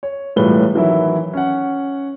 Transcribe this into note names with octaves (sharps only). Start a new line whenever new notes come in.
C#5
E1 A2 G3 F4 B4 G7
D#3 E3 F#3 E4
C#4 F#5